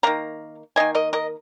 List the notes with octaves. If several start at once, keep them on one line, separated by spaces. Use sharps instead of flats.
D#3 A#3 F5 A#5
D#3 A#3 D#5 G#5
A#4 D#5
A#4 D#5